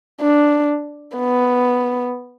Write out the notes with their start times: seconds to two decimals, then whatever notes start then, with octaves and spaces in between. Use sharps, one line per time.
0.21 D4
1.16 B3